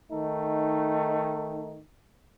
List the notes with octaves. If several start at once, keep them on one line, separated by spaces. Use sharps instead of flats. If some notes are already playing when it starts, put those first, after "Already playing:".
D#3 A3 D#4